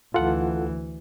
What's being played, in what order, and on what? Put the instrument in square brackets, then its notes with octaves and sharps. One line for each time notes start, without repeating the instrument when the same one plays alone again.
[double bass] D2 E3 [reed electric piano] F4 A4 F#5